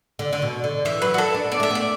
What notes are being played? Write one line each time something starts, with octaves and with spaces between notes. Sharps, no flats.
D3
D3
B2
D3
E3 E5
F#3 B4
F#4
A4
D4
B3 D5
A3 E5
B3 D5